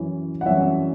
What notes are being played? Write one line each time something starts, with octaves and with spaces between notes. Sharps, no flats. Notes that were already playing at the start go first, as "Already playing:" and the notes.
Already playing: F#2 E3 C#4
F#5
F#2 E3 C#4 E5